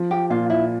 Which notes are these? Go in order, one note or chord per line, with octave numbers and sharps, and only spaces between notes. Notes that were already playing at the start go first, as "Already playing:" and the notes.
Already playing: F3
G4
A#2 F4
E4